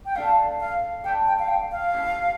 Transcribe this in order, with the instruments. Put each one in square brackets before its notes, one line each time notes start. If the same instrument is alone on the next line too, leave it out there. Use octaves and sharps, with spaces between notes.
[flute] G5
[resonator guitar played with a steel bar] A3 D4 A4 [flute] F5
[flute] F5
[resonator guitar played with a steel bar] A3 D4 A4 [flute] G5
[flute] G5
F5
G5
F5
[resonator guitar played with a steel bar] F3 A3 C#4 E4 G4